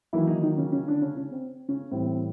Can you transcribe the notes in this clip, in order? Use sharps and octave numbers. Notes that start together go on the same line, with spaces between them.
D#3 E3 F#3 A#3 E4
D#3 D#4
D#3 D#4
C#3 C#4
C#3 C#4
D3 D4
C#3 C#4
C#3 C#4
C4
C#3 C#4
A2 E3 G3 C4
C4